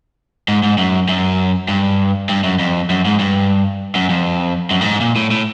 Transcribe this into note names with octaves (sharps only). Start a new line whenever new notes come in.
G#2
G#2
F#2
F#2
G2
G2
F#2
F2
F#2
G#2
G2
F#2
F2
F#2
A2
G#2
A#2
A2
A2